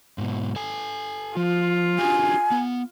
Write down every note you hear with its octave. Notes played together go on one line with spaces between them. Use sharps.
G#2 B2
A4 G#5
F3 F4
D4 F#4 G4 G#5
B3